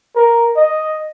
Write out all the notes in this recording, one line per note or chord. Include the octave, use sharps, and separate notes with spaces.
A#4
D#5